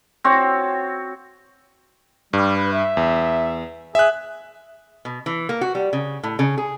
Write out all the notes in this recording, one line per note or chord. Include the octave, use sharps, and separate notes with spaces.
C4 F#4 C#5
G2 G3
B4
E5
E2
G#4 E5 F#6
B2
E3
A#3
F#4
G3
C#3
A2
C#3
G#4